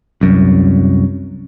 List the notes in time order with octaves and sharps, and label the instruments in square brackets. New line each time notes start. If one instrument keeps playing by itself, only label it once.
[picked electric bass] C2 F#2